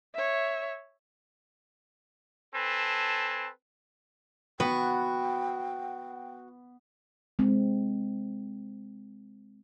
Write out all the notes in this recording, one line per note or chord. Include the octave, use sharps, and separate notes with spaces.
C#5 E5
C4 A4 B4 G#5 A5
B3 F#4 G5
G#3 C4